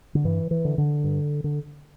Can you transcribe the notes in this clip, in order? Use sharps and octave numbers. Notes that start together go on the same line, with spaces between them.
D3
G2 E3
E3
D3
D3
G2
D3